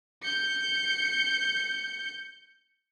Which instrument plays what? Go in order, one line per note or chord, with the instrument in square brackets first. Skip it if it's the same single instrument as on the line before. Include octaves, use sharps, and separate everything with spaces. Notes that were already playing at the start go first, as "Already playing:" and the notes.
[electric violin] G6 C#7